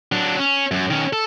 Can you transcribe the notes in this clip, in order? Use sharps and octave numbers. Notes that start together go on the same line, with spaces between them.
F#3 D4
C#4
F#2
D#3 C#4
A4